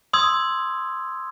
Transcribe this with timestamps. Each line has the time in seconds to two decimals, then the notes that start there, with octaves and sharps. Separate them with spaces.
0.13 C6 D#6 E6 G#6